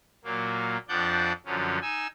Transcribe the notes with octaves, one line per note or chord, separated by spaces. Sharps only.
A#2 F#3 A#3
F2 F3 D4 D5 F#5 G6
F#2 D3 F3 F#3 C#4
D#4 G#5 E6